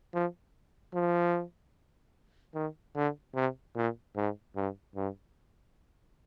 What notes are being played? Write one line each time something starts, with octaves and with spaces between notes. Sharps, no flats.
F3
F3
D#3
D3
C3
A#2
G#2
G2
G2